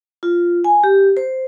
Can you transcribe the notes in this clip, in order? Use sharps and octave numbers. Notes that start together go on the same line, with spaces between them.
F4
G#5
G4
C5